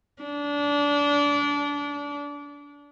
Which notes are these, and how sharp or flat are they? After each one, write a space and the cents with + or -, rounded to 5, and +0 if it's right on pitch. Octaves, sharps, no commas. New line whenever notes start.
D4 -25